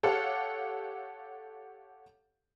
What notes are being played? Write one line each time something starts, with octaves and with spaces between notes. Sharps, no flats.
G4 A4 C#5 F5 F#5